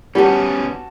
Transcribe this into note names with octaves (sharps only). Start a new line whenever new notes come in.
G3 B3 C#4 F#4 A5